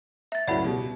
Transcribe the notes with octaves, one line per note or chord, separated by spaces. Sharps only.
E5 A6
C#2 A2 F#3 D5 F#5 B5
B2 G3